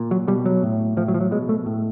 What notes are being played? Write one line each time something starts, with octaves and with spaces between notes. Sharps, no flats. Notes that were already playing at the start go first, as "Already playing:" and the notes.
Already playing: A#2
F#3
B2 G3
F#3
A2
A2 F3
F#3
F3
F#3
B2 G#3
A3
A2